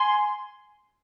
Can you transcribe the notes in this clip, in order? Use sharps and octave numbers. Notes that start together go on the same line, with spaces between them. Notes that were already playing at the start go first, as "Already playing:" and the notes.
Already playing: G#5 C6